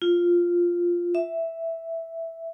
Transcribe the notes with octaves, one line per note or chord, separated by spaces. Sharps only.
F4
E5